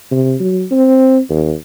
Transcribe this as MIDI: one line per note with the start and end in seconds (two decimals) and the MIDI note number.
0.12 0.35 48
0.40 0.65 54
0.71 1.20 60
1.30 1.54 39